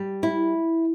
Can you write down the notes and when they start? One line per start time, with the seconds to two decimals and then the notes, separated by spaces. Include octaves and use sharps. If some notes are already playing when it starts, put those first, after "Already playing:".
Already playing: G3
0.23 E4